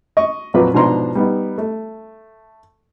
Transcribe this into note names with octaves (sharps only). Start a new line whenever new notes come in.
D#5 C#6
F2 A#2 F#3 F4 B4 D6
G#2 B2 F3 D4 A#5 C6
G3 B3 D#4
A3